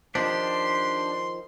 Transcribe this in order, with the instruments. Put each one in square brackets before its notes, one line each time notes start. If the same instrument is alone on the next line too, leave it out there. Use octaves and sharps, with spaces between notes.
[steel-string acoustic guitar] D#3 F3 [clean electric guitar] D4 G4 [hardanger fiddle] C6